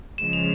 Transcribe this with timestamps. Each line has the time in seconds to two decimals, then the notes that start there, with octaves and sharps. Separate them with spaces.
0.18 C#3 F3 G#3 E7
0.33 F7